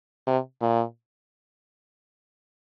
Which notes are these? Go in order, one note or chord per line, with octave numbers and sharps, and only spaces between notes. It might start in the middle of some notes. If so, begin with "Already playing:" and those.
C3
A#2